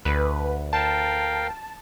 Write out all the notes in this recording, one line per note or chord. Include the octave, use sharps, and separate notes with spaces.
D2 B4
A#4 F5 G5 A5